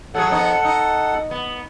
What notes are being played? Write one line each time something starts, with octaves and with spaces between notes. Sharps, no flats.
A2 F#3 G#4 A4 F#5
F2 B3 D#4
D#4
B3